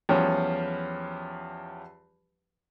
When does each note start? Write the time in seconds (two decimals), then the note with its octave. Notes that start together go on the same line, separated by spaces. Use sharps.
0.09 E2 F3 G3 C#4 G4